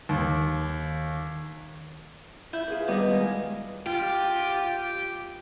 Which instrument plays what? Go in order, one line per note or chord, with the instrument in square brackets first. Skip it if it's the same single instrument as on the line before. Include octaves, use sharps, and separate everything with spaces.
[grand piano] D#2
[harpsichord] E4 [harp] G6
[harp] F4 G#4 B4
[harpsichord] B2 [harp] D#3 G3 D#5
[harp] G#3 G#5
[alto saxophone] F4 [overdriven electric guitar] G4